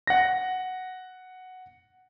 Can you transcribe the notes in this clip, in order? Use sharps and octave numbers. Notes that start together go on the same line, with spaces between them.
F#5 A#6